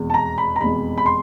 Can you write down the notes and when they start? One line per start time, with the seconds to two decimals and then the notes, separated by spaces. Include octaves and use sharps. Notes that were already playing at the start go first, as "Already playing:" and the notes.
Already playing: F1 E2 B2 G#3
0.10 A5
0.14 A#5
0.38 B5
0.56 A#5
0.61 F1 E2 B2 G#3 B5
0.98 B5
1.06 C6